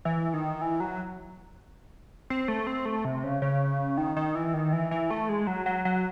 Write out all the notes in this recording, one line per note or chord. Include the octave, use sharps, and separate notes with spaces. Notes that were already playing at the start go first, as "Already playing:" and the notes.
E3
D#3
E3
F#3
C4
A3
C4
A3
C3
C#3
C#3
D#3
D#3
E3
D#3
E3
E3
A3
G#3
F#3
F#3
F#3